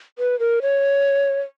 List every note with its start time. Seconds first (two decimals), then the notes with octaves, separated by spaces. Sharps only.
0.19 B4
0.39 A#4
0.62 C#5